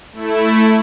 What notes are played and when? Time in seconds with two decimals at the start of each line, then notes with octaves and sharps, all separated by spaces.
0.13 A3 E4